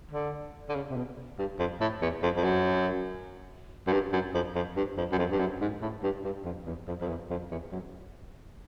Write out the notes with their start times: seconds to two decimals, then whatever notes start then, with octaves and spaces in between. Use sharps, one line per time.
0.11 D3
0.69 D3
0.75 C#3
0.90 C3
0.96 B2
1.38 G2
1.59 F2
1.80 A2
2.02 E2
2.23 F2
2.36 F2
2.44 F#2
3.87 F#2
3.92 G2
4.13 F#2
4.34 F2
4.55 F2
4.76 G2
4.97 F2
5.12 F#2
5.18 F2
5.32 G2
5.39 F#2
5.61 G#2
5.82 A2
6.03 G2
6.24 G2
6.45 F2
6.66 E2
6.87 F2
7.01 F2
7.08 E2
7.30 F2
7.51 E2
7.72 F#2